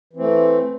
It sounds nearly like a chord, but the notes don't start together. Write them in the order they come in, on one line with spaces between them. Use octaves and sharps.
E3 C4 A3